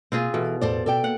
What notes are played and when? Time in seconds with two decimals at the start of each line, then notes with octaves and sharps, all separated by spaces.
0.12 B2 A#3 C4 F4 G#4
0.34 B2 E3 A4
0.61 E2 A2 A4 B4 C5 D5
0.86 B2 A4 D5 G5
1.04 A#3 F#5